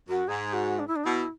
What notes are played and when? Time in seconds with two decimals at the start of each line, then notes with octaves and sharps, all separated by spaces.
0.09 F#2 F#4
0.28 G#2 G#4
0.53 F#4
0.79 D4
0.88 E4
0.96 D4
1.05 B2 E4